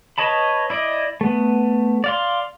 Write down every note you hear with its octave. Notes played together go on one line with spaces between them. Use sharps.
B4 C#5 D#5 A5 B5
E4 D5 D#5
A3 B3
D5 F5 C6